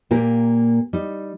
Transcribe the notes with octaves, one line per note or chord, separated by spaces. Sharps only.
A#2 A#3 G4 A#4
G3 D#4